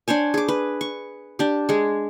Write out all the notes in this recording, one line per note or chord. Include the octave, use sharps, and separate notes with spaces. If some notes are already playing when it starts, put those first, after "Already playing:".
D4 C5 C#5 G#5
G#4 D6
B4
C#6
D4 G4
G#3 G#4